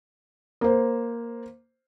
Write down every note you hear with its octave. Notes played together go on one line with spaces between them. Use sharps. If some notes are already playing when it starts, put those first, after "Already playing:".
A#3 C5